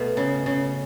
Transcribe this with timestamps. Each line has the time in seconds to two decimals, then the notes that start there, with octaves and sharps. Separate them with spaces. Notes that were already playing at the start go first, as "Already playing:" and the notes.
Already playing: B2 A3 A4
0.17 C#3
0.46 C#3